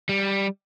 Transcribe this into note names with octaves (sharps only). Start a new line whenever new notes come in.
G3